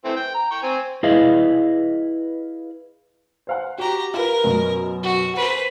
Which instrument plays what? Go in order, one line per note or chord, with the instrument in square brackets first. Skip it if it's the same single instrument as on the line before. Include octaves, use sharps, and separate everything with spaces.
[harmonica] E3 A3 C4
G5
A#5
G5 C#6
C4 G#5
[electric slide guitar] E4 G#4 B4 D#5 F5
[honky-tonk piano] C5 F5 F#5
[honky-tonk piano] F#4 [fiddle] G4 A#5
[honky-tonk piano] F4 B4 [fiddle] A#4
[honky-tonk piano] F#2 B2
[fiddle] F#4
B4 C5